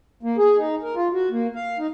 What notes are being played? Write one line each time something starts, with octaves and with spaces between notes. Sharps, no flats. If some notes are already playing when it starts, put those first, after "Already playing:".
A#3
G#4
D#4
A#4
F4
F#4
A#3
F5
D#4